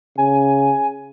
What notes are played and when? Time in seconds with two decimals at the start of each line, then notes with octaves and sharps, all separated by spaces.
0.18 C#3 G#5